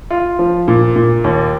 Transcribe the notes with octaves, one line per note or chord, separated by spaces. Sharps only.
F4
F3
A#2
A#2
D#2